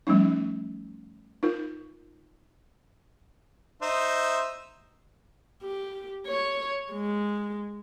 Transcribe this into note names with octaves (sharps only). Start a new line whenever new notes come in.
F3 G3 A3 C#4 D#4
D#4 F4 A#4
D#4 C5 E5
G4
C#5
G#3